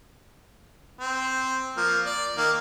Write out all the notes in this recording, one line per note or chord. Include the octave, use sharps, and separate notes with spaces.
C4
F3 A#3
D5
D#3 A#3